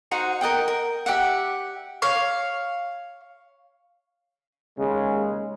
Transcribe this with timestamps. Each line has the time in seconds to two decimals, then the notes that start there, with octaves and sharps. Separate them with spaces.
0.11 D#4 F#4 C5 F#5
0.41 A#4 D#5 F#5 G5
0.68 A#4
1.06 G4 D5 E5 F#5
2.02 C#5 F5
4.77 D#2 C#3 G#3